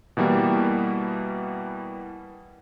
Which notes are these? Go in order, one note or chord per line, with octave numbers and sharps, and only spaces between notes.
B2 E3 G3 A#3 B3